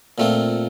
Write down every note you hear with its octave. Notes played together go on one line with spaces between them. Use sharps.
A#2 A3 C4 F4